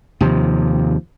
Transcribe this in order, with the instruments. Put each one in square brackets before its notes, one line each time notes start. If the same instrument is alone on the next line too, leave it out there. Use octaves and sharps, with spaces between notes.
[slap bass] D#2 C3 F3